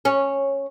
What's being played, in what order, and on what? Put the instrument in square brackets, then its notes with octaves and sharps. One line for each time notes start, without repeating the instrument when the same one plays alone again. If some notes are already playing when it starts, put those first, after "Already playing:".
[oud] C#4